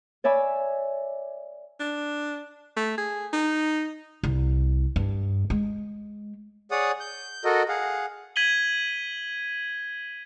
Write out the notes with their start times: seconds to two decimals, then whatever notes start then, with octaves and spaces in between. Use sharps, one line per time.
0.24 C#5 D5 E5 G#5 B5
1.80 D4
2.77 A3
2.98 G#4
3.33 D#4
4.23 C2
4.96 G2
5.50 G#3
6.71 G#4 C#5 D5 F#5 D#6
7.00 G6
7.45 F#4 A4 A#4 D#5
7.68 G#4 F5 F#5
8.36 G#6 B6 D#7 F#7 G7